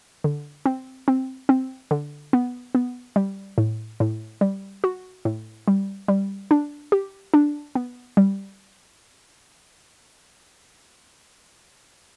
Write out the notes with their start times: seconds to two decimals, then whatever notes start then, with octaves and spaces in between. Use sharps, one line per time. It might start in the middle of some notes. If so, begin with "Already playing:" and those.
0.24 D3
0.66 C4
1.08 C4
1.49 C4
1.91 D3
2.33 B3
2.75 B3
3.16 G3
3.58 A2
4.00 A2
4.41 G3
4.84 F#4
5.25 A2
5.68 G3
6.08 G3
6.51 D4
6.92 G4
7.34 D4
7.75 B3
8.17 G3